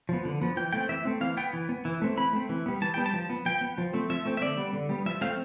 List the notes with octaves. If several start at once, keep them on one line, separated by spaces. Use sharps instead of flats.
F3 B3
D3
F3 B3
E3 G5
A3 C4 G5
E3 E5
A3 C4
E3 F5
B3 G5
E3
B3
E3
A3 C4
E3 B5
A3 C4
E3
G3 B3
E3 A5
G3 B3 G5
A5
F3
B3
F3 G5
B3
F3
A3 C4
F3 E5
A3 C4
E5
D3 D5
G3 B3
D3
G3 B3
F3 E5
A3 C4 F5